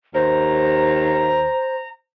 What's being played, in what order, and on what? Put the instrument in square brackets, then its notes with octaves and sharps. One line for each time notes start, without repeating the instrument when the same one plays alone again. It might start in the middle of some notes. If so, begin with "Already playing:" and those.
[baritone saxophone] D#2 [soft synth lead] C5 [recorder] A#5